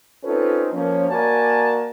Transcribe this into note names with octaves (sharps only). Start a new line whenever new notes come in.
C4 C#4 D#4 F4 A4 B4
F3 A#3 C#4
A#3 F#4 A#4 D5 G#5 A5